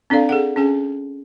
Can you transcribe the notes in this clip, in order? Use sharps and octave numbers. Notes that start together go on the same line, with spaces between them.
C4 D4 A4 D5 F5
G#4 A4 F#5
C#4 G#4 G#5